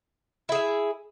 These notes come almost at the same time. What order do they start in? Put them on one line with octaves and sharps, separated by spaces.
E4 G#4 E5